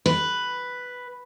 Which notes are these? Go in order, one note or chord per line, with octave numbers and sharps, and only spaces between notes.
B4